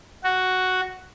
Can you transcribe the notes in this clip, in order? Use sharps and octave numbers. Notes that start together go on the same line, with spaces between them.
F#4